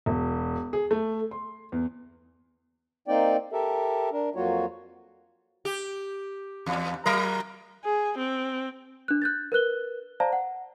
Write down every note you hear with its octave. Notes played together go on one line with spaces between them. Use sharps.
E1
G#4
A3
C6
E2
A#3 C4 D#4 D5 G5
G4 A4 A#4 E5
D4 A#4
F2 F#3 A#3 F4 F#4 C#5
G4
E2
F#3 A#4
G#4
C4
D4 F#6
F#6 G6 A6
A#4 B4 F#6 G7
C5 D5 F5 A5 A#5
F#5